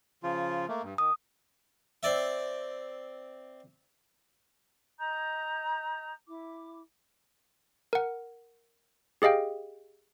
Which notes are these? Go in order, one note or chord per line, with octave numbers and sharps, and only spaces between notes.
C#3 F3 F4
A3 A#3
G2
D#3 D#6
C4 D5 E5
D#5 A#5 D#6 G6
E4 D6
A#4 F#5
G4 G#4 D#5 F5 G5